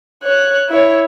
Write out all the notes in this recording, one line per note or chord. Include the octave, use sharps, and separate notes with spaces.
C#5 F#6
E4 C#5